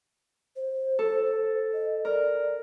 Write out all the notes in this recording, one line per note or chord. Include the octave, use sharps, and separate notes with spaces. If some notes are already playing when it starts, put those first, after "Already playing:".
C5
A4
D#5
A#4 D5